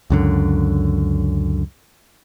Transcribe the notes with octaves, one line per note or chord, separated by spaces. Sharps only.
C#2 F#2 D3